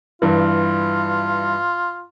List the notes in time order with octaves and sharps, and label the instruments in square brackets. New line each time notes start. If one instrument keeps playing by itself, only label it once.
[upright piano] G2 E3 [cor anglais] F4